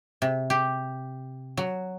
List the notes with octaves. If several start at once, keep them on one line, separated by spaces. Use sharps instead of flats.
C3
G4
F#3